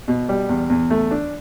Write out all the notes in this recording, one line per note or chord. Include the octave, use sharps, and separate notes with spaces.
B2
G3
E2
E2
A3
D4